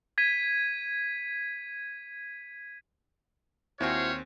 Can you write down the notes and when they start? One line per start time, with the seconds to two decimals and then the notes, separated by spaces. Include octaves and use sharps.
0.18 G#6 B6 D#7
3.80 D#2 C4 E4 F#4 C5 C#5 F5 G#5